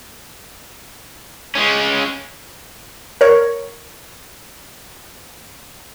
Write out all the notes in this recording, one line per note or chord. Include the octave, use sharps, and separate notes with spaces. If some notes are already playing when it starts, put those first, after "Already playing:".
G#3 C#4
A#4 C#5